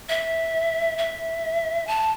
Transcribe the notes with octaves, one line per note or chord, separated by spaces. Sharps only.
E5
E5
A5